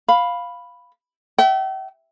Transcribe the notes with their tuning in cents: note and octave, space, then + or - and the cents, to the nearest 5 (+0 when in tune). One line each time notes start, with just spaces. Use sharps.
F5 +5 B5 +0
E5 -5 G5 -45